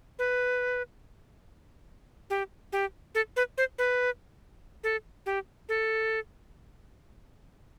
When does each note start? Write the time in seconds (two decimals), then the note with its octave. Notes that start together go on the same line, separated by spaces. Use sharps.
0.19 B4
2.30 G4
2.72 G4
3.15 A4
3.36 B4
3.58 C5
3.78 B4
4.84 A4
5.26 G4
5.69 A4